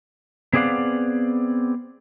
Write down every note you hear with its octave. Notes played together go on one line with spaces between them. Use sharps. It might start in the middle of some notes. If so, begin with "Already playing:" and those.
B3 C4 G#4 D5 F5 F#5